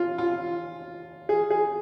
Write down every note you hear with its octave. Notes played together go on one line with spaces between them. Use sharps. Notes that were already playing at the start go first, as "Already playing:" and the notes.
Already playing: F4
F4
G#4
G#4